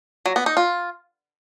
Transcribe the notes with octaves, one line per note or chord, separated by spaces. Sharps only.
F#3
B3
D#4
F4